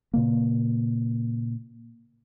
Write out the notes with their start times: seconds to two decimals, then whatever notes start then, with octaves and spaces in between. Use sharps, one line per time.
0.14 A#2 C#3 A#3